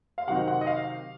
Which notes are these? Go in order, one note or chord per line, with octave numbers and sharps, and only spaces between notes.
F5
C3 D#3 F#3 C4 D#4 F#5
F#5
D#5
F5